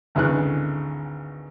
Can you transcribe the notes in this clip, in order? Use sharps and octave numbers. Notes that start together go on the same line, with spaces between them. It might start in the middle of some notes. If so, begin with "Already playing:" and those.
G#1 D2 C#3 E3 F#6